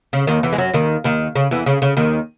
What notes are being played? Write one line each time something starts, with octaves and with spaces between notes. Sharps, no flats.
C#3
D#2 D#3
E2 E3
G#3
F#2 F#3
D#2 D#3
D#2 D#3
C#3
E2 E3
C#3
C#3
D#2 D#3